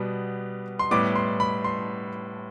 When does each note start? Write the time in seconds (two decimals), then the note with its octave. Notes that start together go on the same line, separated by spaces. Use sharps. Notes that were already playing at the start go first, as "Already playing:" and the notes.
Already playing: B2 G3 B3
0.79 C6
0.91 A2 G3 B3 D6
1.16 C6
1.40 B5
1.64 C6